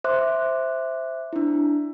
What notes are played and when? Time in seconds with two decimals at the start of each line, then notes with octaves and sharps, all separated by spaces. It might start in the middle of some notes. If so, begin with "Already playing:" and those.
0.04 C5 E5 C6 D6 F#6
1.33 D4 E4